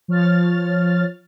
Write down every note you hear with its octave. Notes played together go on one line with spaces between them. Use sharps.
F3 C#5 F6 A6